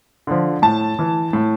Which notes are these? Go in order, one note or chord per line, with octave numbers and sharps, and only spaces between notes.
D3 F3
A2 A5
E3
A2